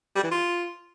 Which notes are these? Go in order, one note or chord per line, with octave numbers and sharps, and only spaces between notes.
G3
E3
F4